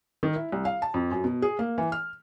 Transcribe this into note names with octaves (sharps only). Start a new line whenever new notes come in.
D#3
E4
C2
F5
A5
F2
F#2
B2
G#4
A#3
E3
F6